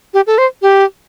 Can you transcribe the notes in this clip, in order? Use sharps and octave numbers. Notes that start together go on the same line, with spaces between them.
G4
A4
C5
G4